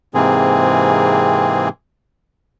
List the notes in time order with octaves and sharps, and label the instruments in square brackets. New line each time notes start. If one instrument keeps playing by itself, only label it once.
[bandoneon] G#2 C3 E3 A#3 C4 G#4